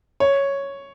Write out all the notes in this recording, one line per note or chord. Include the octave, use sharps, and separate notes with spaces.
C#5